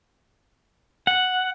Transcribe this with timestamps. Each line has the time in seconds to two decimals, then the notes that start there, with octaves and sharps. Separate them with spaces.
1.07 F#5